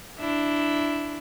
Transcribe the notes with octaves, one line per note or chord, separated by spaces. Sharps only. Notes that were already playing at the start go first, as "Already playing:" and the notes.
D4 E4